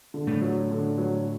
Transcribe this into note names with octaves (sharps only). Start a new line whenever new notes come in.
D3
A2 A3
F#3
D3
F#3